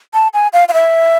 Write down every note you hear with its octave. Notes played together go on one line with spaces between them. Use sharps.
A5
G#5
F5
F5
E5